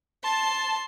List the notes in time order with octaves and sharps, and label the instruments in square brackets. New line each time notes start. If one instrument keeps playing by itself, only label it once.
[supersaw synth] A5 [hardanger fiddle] C6